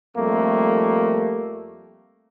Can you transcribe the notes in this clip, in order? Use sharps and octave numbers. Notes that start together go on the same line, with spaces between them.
F2 G3 A3 A#3